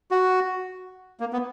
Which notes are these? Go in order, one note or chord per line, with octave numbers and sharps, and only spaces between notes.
F#4
A#3
B3